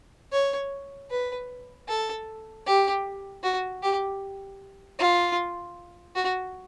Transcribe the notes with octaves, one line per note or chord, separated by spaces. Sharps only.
C#5
B4
A4
G4
F#4
G4
F4
F#4